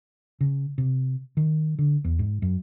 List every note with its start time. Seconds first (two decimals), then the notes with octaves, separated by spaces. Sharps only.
0.41 C#3
0.78 C3
1.37 D#3
1.79 D3
2.04 E2
2.19 G#2
2.42 F#2